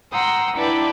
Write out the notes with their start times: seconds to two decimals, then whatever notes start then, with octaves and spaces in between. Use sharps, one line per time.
0.13 F#5 G5 A#5 C6 D#6 E6
0.57 D4 E4 B4 D5 G5 A5